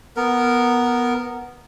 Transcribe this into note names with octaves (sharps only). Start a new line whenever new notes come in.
B3 A#4